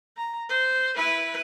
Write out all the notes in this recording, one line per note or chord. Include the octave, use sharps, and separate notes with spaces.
A#5
C5
E4 B4